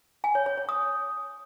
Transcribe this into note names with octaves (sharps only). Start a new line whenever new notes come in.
G#5
C#5
C#5
C#5
D#6